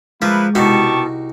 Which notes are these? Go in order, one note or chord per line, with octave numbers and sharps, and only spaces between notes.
F3 G#3 A#3 E4 B4
C2 B2 D#4 F#4 G4 A5 C#6